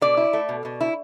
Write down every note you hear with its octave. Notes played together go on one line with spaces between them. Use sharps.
B2 D5
E4
A3
B2
B2
E4